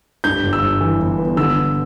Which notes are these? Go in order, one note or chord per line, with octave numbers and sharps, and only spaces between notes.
G2 G6
G1
E6
G1
E3
G1
B3
D3 E6
G2